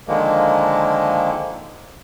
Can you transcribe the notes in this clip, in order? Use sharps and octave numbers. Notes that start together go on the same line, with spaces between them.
D3 D#3 F3 G#3 A#3